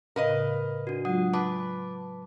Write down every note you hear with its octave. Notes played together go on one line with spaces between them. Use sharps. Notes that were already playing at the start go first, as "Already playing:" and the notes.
A2 C#3 A#4 B4 D#5 F5
D4 F#4
F#3 G#3 D4 F4 F#5 D#6
B4 A5 D6